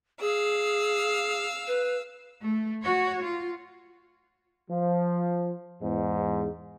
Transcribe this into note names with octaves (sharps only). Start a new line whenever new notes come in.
G#4 F5 E6
B4
A3
F#4 C#5
F4
F3
E2 G#2